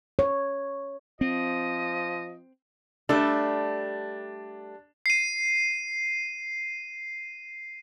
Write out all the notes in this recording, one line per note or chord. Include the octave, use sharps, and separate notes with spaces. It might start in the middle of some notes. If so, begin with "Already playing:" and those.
C#5
F3 C4 D#5
G3 A3 D4 A4
C7 D#7